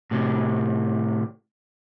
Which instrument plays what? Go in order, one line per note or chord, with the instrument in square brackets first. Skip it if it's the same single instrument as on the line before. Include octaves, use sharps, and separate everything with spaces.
[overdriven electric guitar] A2 C3